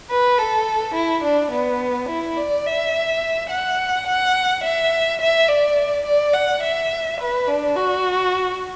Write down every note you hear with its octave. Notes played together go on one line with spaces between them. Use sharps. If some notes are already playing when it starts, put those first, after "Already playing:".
B4
A4
E4
D4
B3
E4
D5
E5
F#5
F#5
E5
E5
D5
D5
F#5
E5
B4
D4
F#4